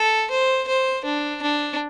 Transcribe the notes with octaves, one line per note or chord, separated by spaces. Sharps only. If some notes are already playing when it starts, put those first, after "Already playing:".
Already playing: A4
C5
C5
D4
D4